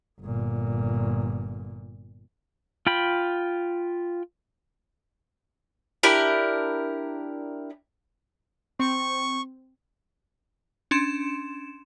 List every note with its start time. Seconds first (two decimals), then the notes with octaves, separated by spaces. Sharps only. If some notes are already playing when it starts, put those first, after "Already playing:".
0.21 G1 A#2
2.87 F4 G5 B5
6.03 D4 E4 G4 A#4
8.80 C4 C#6
10.91 C#4 D4 C6 E7